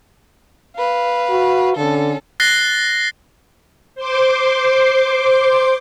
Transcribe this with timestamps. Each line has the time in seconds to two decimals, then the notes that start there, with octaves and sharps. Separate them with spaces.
0.77 B4 F5
1.30 F#4
1.77 D3 C#4 A4
2.40 F#6 A6 A#6 C7 G7
3.95 C5 C6 D6